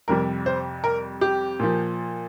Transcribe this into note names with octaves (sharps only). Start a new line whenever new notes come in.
F2 C3 G3 A#4
C5
A#4
G4
A#2 F3